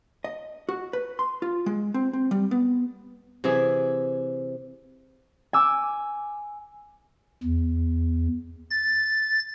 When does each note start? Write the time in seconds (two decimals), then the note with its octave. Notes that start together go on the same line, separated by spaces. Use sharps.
0.24 D#5
0.69 F#4
0.93 B4
1.19 C6
1.42 F4
1.66 G#3
1.94 C4
2.13 C4
2.31 G3
2.51 B3
3.44 C3 E3 G#4 E5
5.53 G#5 D6 E6
7.43 E2
8.71 A6